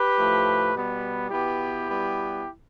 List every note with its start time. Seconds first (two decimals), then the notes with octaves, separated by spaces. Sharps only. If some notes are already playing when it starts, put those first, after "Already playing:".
Already playing: G4 B4
0.17 A2 F3 A3
0.73 B2 G3 B3
1.30 B2 B3 E4 G4
1.88 B2 G3 B3